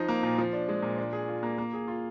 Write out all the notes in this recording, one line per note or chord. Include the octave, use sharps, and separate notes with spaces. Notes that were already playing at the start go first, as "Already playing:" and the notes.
Already playing: F3 D#4
A#3
A#2
F3
D4
G#3
A#2
D4
G#4
F4
A#3
A#3
G#4
F4